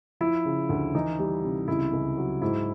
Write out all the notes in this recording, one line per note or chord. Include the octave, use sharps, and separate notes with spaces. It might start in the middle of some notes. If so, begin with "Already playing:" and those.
F3 E4
C#3
D2
E3 D#4
G3
C3
C#2 E4
C#2
F#3
G#2 E4